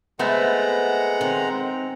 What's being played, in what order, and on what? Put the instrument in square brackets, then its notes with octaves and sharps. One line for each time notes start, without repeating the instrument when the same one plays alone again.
[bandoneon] G#3 F#5 A#5 [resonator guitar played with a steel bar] A3 B3 [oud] C4
[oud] D#3 [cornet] C4